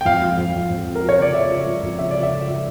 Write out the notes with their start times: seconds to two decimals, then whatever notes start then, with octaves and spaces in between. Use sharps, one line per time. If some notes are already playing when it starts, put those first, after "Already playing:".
0.01 G5
0.05 F2 F5
0.22 F3
0.37 F2
0.54 F2
0.70 F2
0.86 F2
0.95 A#4
1.02 F3
1.09 C#5
1.18 C#3 D5
1.34 C#3 E5
1.50 F3
1.66 F3
1.82 F2
1.99 C#3 E5
2.11 F3 D5
2.23 E5
2.31 C#3
2.47 F3